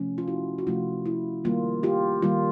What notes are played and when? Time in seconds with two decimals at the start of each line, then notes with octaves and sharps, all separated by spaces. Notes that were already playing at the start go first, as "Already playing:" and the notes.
Already playing: C3 F3 A3 C#4
0.18 F4
0.28 E4 F#4
0.58 F#4
0.67 C3 F3 A3 C#4 E4 F4
1.06 E4
1.44 D#3 G3 A#3 F4
1.83 F4 G4
2.22 D#3 G3 A#3 F4